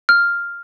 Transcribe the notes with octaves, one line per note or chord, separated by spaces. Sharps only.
F6